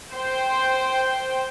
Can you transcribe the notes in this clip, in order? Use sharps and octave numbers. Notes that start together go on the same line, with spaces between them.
C5 G5